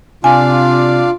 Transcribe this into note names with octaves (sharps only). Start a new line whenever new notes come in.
C3 D4 F4 D5 F5 G#5